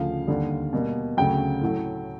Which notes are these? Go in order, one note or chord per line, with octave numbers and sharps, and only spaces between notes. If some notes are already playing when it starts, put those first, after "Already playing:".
Already playing: D2 C#3 F3 F5
D#2 D3 G3
B2 G3 A#3
D2 C#3 F#3 G5
A2 F#3 A3